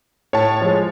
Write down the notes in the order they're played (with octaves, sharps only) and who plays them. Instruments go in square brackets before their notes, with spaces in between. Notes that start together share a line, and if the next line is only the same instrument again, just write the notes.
[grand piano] A2 [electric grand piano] C#5 A5
[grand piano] F3 G#3